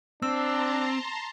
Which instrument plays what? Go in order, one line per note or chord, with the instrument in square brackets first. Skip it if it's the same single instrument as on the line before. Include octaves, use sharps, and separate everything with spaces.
[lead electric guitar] C4 [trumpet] D4 [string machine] A5 A#5 C6 [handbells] E6